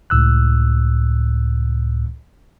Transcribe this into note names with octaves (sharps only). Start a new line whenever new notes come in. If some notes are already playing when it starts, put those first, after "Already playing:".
C#2 A2 E6 F#6